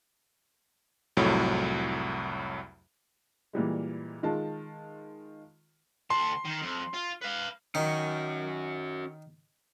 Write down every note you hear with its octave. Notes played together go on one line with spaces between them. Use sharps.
C2 F2 A2 F#3
A#2 E3 G3 G#3
D#3 G#3 F4 A5
D2 A5 C6
D#3
F2
F4
B4 F5
D#3 C#4 F#4